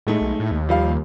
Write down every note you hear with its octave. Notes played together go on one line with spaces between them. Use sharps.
A2 G#3 A3 D#4
B1
A2
D#2
F3 G3 F5